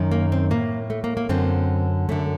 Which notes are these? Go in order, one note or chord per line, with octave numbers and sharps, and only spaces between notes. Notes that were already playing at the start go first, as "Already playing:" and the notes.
Already playing: F#2 D#3
A#3
C4
A2 A#3
A3
A#3
A#3
F#2 D3 C4
F#2 D3 A3